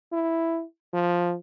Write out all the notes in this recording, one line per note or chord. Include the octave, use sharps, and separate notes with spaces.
E4
F3